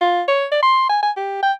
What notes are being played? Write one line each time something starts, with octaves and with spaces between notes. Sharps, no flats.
F4
C#5
D5
C6
G#5
G#5
G4
G5